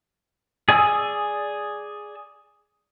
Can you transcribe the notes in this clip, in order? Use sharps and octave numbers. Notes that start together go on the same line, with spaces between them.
G#4 D5 G#5 D#6 E6